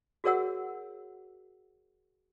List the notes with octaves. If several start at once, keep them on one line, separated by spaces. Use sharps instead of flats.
F#4 G#4 A#4 C#5 F#5 E6